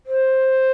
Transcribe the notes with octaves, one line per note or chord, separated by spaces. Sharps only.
C5